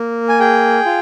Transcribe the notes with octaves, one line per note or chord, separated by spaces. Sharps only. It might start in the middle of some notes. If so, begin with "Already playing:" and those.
Already playing: A#3
G#5
G#4 G5
F4